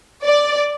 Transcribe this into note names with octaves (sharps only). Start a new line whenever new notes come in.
D5